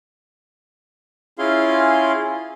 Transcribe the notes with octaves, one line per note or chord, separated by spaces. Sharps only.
C#4 E4 F4 G#4 F5 C6